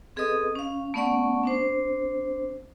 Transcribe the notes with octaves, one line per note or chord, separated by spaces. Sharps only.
C4 G#4 A4 B4 D#5 D#6
C#4 F5
A3 B3 C#4 D5 F#5 C#6
C4 D4 C5